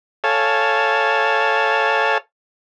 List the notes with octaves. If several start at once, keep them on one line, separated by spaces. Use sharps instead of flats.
A4 C#5 F5 G#5 A5